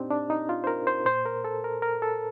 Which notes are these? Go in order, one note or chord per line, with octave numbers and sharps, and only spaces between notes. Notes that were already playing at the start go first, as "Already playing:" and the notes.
Already playing: A#2 C4 D4 D#4 G4
D4
D#4
F4
C5
A#4
C5
A#2 C5
A#4
A4
A#4
A#4
A4